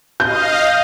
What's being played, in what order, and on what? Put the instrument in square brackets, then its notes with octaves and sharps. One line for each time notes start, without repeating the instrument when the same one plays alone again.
[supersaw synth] D#5 F5 [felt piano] G6